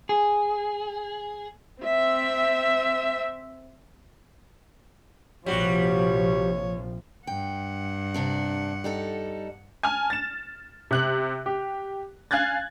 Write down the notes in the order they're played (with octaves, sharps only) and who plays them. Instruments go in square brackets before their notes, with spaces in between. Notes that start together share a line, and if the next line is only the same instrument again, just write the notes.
[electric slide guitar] G#4
[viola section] C4 E5
[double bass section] A#1 C3 [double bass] F3 [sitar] G3 F#4 [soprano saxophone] C#5
[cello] G2 F#5 [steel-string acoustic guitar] G5
[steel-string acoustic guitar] C3 D4 D5
G3 D#4 A4
[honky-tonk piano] G#5 A5 F6
A6 E7
C3 F#6 F#7
G4
F5 G#5 F#6 G#6 A6